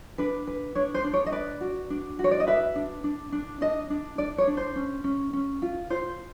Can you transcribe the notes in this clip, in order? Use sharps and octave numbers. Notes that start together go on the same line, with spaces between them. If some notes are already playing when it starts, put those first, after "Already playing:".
D4 B4
B4
D4 C#5
C5
D4
C#5
D#5
B4 D5
F#4
D4
F#4
C#5
D5
D#5
B4 E5
D4
D4
D4
D4 D#5
D4
D4 D5
C#5
D4
C5
C#4
C#4
C#4
F4
F4 C5